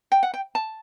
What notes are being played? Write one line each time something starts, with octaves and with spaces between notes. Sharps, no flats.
G5
F#5
G5
A5